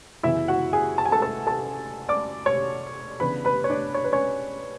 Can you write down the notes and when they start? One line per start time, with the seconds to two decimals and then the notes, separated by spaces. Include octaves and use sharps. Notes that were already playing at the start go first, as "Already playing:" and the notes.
0.23 F#2 C#3 E3 B3 E4 E5
0.48 F#4 F#5
0.73 G#4 G#5
0.98 A5
1.05 G#5
1.12 A4 A5
1.22 A4 A5
1.47 A4 A5
2.09 D5 D6
2.46 C#5 C#6
3.20 C#3 E3 B3 D4 B4 B5
3.45 B4 B5
3.64 C#5
3.70 D4 D5
3.94 C#5
4.04 B4
4.12 C#4 C#5